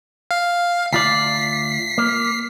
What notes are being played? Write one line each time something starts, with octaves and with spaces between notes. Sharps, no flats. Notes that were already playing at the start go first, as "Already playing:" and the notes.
F5
D2 F4 D5 B6 C7
A#3